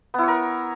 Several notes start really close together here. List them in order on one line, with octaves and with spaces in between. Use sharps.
B3 E4 C#5 A#4